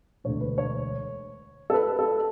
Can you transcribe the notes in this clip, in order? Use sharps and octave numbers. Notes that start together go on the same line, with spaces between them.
E1 D2 D3 C#5
B4
C#5
A4
B4
A4